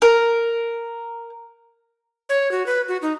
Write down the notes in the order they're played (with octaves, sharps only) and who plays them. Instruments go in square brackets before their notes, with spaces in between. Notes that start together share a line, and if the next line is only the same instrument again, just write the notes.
[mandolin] A#4
[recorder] C#5
F#4
B4
F#4
D#4